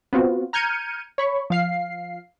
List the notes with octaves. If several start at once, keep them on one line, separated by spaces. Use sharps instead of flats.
B3 C4 F4 F#4
A#5 F6 G6 G#6 C#7 D#7
C#5 B5 C#6
F3 F5 C7